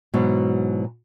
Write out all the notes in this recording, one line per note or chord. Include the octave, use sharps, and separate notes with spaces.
G#2 B2 E3 F#3